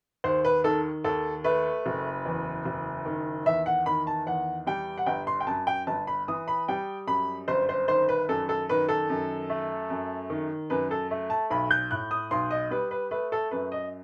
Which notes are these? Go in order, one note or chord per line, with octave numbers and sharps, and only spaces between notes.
D#2 C5
B4
D#3 A4
D#2 A4
A3 B4
F#1
E2
F#1
D#3
E2 E5
F#5
D#3 B5
A5
E2 F#5
G3 G5
F#5
G1 G5
C6
G5
F#2 A5
G5
G1 A5
B5
E3 D#6
B5
G3 G5
F#2 B5
G1 C5
C5
D#3 C5
B4
F#2 A4
A4
D#3 B4
A4
F#2
A3
F#2
D#3
F#2 B4
A4
A3
A5
B1 B5
G6
A2 F#6
D#6
B1 C6
D#5
G3 B4
B4
A3 B4
A4
F#2 B4
D#5